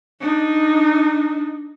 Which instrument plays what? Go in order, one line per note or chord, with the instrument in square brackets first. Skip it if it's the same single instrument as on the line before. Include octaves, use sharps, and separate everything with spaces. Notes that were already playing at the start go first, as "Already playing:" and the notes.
[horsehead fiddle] D4 D#4